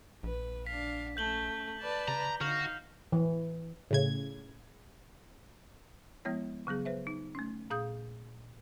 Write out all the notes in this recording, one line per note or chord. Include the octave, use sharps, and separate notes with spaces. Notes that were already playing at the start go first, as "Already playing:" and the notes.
A#1 B4
D4 F5 B6
A3 C#4 G6 F#7 G7
B4 D5 A5
C#3 A#5
D3 D#4 F#4 F5 F6 G6 F7
E3
A2 C#3 G#6
F3 G#3 B3 E4 C#5
C#3 F#3 B3 G#4
B4 C5 E5
D#4
A3 C#4
A#2 G#4 F5 D#6 G6